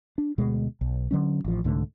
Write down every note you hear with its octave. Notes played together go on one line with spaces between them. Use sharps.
D4
D2 B2 G#3
B1
D3 F#3 C#4
A1 F3
C2 G#2 D3 A3